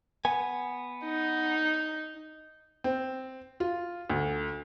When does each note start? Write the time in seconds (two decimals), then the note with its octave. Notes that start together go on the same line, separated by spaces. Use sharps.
0.25 B3 G#5
1.05 D#4
2.84 C4
3.60 F4
4.10 D2